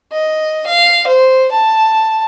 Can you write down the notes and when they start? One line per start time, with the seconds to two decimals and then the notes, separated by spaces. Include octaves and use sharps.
0.12 D#5
0.66 F5
1.07 C5
1.51 A5